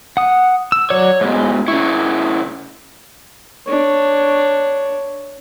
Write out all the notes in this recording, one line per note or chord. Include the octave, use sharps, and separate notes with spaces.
F#5 D#6
E6
F#3 C#5 D5
G#2 B2 G#3
C#3 E4 C#6
D4 C#5